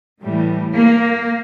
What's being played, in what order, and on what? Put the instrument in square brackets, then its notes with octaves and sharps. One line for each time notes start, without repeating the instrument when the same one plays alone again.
[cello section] A2 E3 G3
A#3